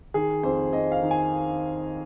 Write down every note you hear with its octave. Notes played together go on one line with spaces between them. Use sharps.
D#3 G#4
F2 C5
F2 D#5
F5
D#3
G#5